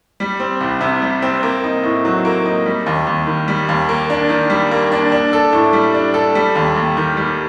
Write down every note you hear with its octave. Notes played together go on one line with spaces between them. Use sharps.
G3
C4
C2
C3
G3
C4
A#3
D#4
A2
F#3
A#3
D#4
G3
D#2
D#2
D#3
G3
D#2
A#3
D4
D#3
G3
A#3
D4
D4
A4
A2
G3
D4
A4
G3
D#2
D#2
D#3
G3